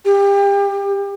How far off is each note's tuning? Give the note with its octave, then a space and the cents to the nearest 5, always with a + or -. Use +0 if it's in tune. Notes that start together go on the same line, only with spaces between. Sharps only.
G4 +30